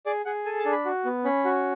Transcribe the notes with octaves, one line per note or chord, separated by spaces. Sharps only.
G#4 D5
G#4 F#5
A4 G#5
A5
D4
B5
F#4
B3
C#4 B5
F#4